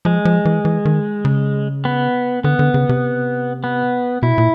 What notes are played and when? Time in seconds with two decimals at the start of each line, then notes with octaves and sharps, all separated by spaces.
0.05 F3 G#3
0.25 F3
0.45 E3
0.65 E3
0.85 D#3
1.25 C#3
1.85 B3
2.44 D3 B3
2.59 D3
2.74 C#3
2.89 C3
3.64 B3
4.23 B2 E4
4.38 A#2